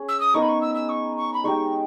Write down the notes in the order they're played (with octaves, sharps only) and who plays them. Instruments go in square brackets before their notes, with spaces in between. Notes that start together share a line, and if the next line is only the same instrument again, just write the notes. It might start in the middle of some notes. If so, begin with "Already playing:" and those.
Already playing: [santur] C#4 G#4
[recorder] E6
D#6
[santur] B3 D#4 A#4 D#5 [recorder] C#6
[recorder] B5
C#6
E6
E6
C#6
C#6
B5
[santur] G#3 D#4 G4 [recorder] C#6